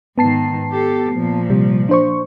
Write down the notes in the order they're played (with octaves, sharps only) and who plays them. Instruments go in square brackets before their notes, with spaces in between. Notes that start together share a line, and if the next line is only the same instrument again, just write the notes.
[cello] G#2 D#3 [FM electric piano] B3 A5 C7
[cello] G4 A4
A#2 F3
[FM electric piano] C3 G3
D4 C5 C#6